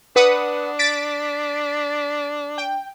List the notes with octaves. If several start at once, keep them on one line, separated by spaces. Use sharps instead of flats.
D4 B4 F#5 D#6
A6 B6 D7
G5